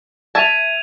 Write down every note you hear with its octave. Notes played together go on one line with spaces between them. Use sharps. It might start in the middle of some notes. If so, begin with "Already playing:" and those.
E5 A5 G#6 D#7 F7